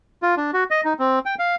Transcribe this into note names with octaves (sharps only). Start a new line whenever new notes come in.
F4
D4
F#4
D#5
D#4
C4
G5
F5